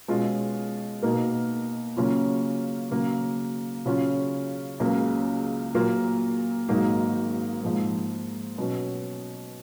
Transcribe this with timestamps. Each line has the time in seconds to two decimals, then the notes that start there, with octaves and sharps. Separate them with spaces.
0.08 B2 G#3 C#4 F4
1.02 B2 A#3 D#4 A#4
1.97 C#3 F#3 A#3 C#4 F4
2.91 C#3 F#3 A#3
3.86 C#3 F#3 C#4 F4
4.80 C#2 C#3 F#3 A#3
5.74 A#2 F#3 A#3 F4 A#4
6.68 G#1 G#2 F#3 A#3 D#4
7.63 G#2 F3 A#3
8.58 B2 F#3 C#4